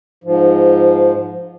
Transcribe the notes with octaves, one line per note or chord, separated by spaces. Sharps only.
G#2 F3